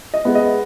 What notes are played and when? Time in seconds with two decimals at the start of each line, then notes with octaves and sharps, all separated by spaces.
0.14 D#5
0.25 G#3 B3
0.35 D#5